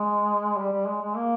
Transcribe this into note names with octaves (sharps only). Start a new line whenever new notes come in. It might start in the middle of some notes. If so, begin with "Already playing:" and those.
Already playing: G#3
G3
G3
G#3
G#3
A#3